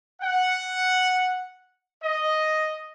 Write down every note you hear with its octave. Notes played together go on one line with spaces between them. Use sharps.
F#5
D#5